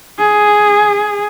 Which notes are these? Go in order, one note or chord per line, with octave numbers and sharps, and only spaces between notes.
G#4